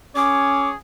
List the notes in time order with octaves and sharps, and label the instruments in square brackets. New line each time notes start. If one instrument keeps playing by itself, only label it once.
[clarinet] C#4 [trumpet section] G#4 C#5 [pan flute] D6